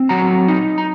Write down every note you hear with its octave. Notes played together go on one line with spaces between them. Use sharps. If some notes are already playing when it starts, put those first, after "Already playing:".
Already playing: C4
F#3 F#5 A#5
D#4
A#5